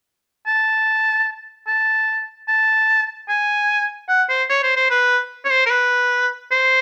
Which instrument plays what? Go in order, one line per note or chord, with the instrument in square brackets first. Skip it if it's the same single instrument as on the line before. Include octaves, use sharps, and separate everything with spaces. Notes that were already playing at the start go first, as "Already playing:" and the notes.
[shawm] A5
A5
A5
G#5
F#5
C5
C#5
C5
C5
B4
C#5
C5
A#4
B4
C5